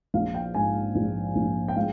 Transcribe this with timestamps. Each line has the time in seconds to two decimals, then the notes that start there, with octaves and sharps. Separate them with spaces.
0.14 A#1 F5
0.34 G5
0.54 G#2 G#5
0.95 A#1
1.36 A#1
1.68 G5
1.76 G#3 F5